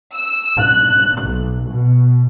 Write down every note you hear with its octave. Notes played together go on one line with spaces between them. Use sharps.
E6
F#6
B1
B2